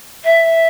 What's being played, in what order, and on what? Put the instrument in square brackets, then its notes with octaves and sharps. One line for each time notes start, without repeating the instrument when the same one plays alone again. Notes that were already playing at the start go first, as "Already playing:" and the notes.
[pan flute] E5